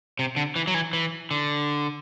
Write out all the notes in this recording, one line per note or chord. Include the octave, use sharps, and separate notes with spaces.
C3
D3
E3
F#3
E3
E3
D3